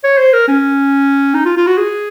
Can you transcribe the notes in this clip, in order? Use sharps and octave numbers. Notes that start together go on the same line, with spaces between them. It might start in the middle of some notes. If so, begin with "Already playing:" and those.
C#5
C5
A#4
C#4
D#4
F4
F4
F#4
G#4